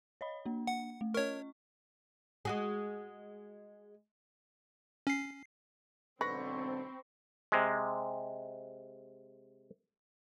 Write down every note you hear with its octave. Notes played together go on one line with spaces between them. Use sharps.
C#5 D#5 B5
A#3 D4
F#5
A3
C#4 A#4 C#5 D#5 C#6
G#3 F#4 G#4
C#4 C7
B1 G#2 D3 C4 B4 B5 C#6 A#6
C3 G#3